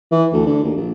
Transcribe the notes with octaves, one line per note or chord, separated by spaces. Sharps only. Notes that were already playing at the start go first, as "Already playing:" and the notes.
E3
D2
D3
D#2
A#1